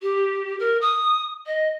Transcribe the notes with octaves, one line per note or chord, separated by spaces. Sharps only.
G4
A#4
D#6
D#5